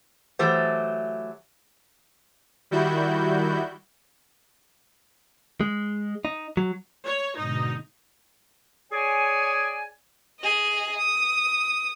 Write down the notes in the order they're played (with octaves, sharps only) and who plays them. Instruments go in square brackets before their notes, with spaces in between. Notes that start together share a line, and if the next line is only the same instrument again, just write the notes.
[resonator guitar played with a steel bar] E3 F#3 A3 G4 C5
[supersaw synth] D#3 G3 E4 F#4 G6
[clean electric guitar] G#3
D#4
F#3
[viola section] C#5
[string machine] G#2 B2 D3 [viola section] D#4
[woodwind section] G#4 C#5 D5 G#5
[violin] G#4 D#5
D#6